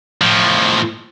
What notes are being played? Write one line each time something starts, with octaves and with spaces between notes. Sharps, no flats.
A2 F3